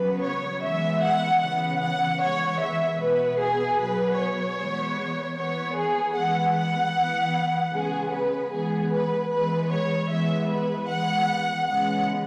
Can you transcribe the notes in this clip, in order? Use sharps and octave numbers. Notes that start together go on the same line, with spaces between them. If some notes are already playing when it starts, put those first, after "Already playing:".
Already playing: C#3 F#3 B3 B4
C#5
E3 G#3 B3 E5
F#5
C#3 E3 B3 F#5
F#5
E3 G#3 B3 C#5
E5
B2 B3 B4
G#4
B2 F#3 B3 B4
C#5
E3 G#3 B3
E3 B3 C#5
G#4
E3 G#3 B3 F#5
F#5
E3 B3
C#3 G#3 B3 G#4
B4
E3 G#3 B3 G#4
B4
E3 G#3 B3 B4
C#5
E3 G#3 B3 E5
B4
E3 G#3 B3 F#5
C#3 E3 G#3 B3 F#5